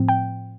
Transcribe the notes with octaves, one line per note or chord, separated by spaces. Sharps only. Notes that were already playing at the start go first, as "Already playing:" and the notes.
Already playing: A2 F3 C4
G5